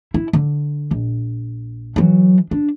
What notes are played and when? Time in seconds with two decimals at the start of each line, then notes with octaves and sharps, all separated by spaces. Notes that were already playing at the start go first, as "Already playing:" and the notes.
0.14 E4
0.33 D3
0.91 A#1
1.96 E3 F#3
2.51 D4